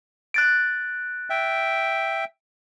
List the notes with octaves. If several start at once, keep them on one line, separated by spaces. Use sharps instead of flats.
F#6 A6 D7
E5 G5